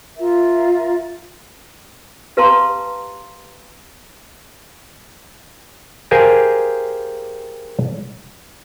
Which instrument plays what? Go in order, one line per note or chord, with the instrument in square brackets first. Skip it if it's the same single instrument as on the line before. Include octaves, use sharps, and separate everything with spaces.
[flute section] F4 A#4 E5
[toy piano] G4 B4 F5 A5 A#5 C6
[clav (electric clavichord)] G4 G#4 A#4 C5 F5 G#5